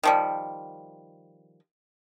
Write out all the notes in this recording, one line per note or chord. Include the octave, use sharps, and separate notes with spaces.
D#3 F3 G3